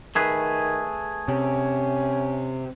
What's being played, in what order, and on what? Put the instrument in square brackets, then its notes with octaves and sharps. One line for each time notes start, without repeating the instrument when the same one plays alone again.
[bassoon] D#3 [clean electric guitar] A3 G#4 B4
[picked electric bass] C3 [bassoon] C#4